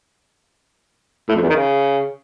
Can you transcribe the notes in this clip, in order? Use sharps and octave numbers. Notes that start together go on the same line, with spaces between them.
A2
F2
E2
D#3
C#3